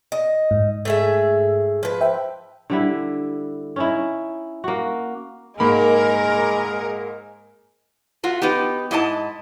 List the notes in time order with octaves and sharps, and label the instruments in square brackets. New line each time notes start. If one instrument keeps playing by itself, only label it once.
[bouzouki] D#5
[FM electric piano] G#2
[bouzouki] A3 G#4 E5
F3 B4
[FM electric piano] C5 E5 G5
[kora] D3 G3 E4
C#4 D#4 E4
A#3 F#4
[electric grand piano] G#2 A#3 B5 [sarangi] G#3 [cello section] A#4
[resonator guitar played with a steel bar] A3 F4 F#4
B3 D#4 G4
G#2 E4 D#5 G#5 A5